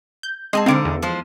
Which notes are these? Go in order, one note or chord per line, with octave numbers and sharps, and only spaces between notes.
G6
G#3 C4 G#4 D#5 A5 C6
B2 D3 C4 D#4 F5 D7
E2
F3 G#3 C5